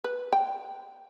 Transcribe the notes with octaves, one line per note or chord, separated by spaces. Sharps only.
B4
G5